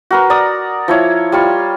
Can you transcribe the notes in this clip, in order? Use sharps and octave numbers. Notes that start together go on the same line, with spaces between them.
F#4 A#4 B4
D5 A#5 D#6
F3 E4 C#5
G3 F4 C#6